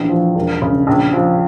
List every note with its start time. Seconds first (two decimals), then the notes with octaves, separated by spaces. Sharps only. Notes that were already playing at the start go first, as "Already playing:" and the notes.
Already playing: A#1 E3
0.09 F3
0.35 E1
0.62 C#3
0.87 A#1
1.13 F3